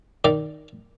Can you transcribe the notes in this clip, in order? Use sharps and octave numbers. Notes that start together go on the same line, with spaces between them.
D#3 D5